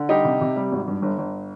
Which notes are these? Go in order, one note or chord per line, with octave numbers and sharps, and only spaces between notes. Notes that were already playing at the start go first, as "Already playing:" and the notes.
Already playing: D3
G3 D#4 G4
C3
C3
G3
G#1
G2
G1
G1